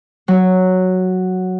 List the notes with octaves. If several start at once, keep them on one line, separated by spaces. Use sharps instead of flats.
F#3